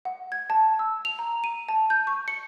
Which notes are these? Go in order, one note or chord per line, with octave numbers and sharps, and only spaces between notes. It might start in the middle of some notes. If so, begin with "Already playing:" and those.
F#5
G#6
A5
E6
F7
A#5
D#7
A5
G6
C#6
C#7